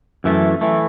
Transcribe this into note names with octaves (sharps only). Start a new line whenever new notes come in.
F#2 E3 A3
E3 A3